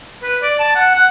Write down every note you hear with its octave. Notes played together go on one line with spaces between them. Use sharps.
B4
D5
A5
F#5
F#5